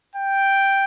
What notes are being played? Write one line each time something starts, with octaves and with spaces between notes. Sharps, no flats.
G5